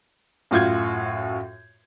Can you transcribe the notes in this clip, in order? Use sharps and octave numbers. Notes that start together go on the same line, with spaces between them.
F#2 A2 F4 F#4 G6 G#6